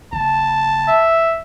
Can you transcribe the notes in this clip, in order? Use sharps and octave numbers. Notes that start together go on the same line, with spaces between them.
F#1 A5
E5